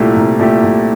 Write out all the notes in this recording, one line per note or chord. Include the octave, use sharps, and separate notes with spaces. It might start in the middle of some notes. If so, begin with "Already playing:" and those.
Already playing: C2 A#2 A3 E4 G4
C2
A#2 A3 E4 G4
C2